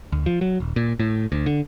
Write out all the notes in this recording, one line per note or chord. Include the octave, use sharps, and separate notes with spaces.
D2
F3
F#3
D#1
A#2
A2
D2
D3